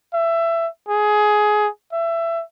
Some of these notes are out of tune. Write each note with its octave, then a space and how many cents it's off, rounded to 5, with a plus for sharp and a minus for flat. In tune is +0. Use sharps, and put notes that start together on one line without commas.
E5 +20
G#4 +15
E5 +20